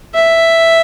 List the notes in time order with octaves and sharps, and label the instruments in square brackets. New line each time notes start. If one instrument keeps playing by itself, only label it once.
[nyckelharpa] E5